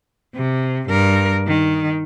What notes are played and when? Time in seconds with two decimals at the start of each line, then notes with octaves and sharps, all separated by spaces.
0.36 C3
0.88 G2 A#4
1.47 D#3